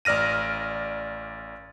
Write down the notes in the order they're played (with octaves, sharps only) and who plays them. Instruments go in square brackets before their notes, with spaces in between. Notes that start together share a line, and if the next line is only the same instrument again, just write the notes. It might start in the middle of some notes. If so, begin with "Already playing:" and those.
[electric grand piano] A1 D5 F6 A#6 D#7